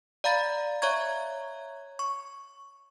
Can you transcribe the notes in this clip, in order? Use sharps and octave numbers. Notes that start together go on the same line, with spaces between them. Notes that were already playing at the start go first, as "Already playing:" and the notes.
D5 F5 A#5 B5 A6
C#5 E5 A#5 C#6 G#6
C#6